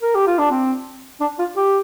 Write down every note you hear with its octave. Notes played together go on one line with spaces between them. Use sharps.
A#4
G4
F4
D4
C4
D4
F4
G4